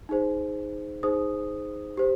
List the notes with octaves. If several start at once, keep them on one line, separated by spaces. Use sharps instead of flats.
D#4 G#4 C5
D#4 G#4 C5 D#6
G4 C5